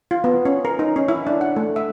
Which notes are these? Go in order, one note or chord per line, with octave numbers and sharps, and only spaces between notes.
F4
B3
C#4
A#4
D#4
C#4
E4
D4
F#5
A3
E5